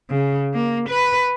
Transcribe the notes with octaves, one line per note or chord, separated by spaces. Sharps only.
C#3
A#3
B4